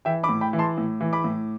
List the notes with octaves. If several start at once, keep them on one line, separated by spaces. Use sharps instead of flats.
E3 E5 G5
B5 D6
A2
G5 B5
E3
A5 C6
A2
E3
B5 D6
A2